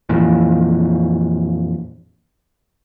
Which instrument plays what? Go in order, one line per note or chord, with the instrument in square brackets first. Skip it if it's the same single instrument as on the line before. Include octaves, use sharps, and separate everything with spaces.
[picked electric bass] F2 A#2 E3